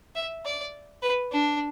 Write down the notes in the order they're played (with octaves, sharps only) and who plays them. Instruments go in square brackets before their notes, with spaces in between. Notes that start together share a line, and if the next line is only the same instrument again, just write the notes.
[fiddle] E5
D5
B4
D4